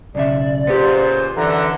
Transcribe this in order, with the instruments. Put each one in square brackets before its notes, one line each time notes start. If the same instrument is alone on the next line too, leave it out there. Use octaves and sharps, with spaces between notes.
[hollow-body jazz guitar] B1 C#3 E5 [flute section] D5
[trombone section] A#2 C#3 C5 [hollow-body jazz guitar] B3 G4
[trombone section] F#2 D3 E3 [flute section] A4 D5 A#5